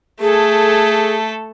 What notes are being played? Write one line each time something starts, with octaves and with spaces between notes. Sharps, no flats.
A3 G#4 A4